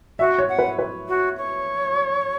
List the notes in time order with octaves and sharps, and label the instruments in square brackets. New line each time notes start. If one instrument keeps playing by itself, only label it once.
[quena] F#4 [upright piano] E5
[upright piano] C#5
[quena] F#5
[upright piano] B4
B4
[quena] F#4
C#5